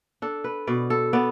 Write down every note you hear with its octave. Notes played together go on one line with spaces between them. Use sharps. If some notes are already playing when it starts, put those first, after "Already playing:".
D4 A4
B4
B2 D5
A4
B3 D5